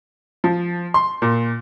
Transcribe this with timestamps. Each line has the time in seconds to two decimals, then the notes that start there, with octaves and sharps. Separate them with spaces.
0.44 F3
0.94 C6
1.22 A#2